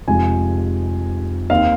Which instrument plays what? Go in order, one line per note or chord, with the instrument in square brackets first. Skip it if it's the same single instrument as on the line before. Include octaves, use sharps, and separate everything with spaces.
[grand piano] F1 F2 C3 F3 G#3 G#5
D#2 D#3 C4 F5